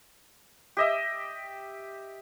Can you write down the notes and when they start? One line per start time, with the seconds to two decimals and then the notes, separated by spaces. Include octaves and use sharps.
0.77 G4 D#5 E5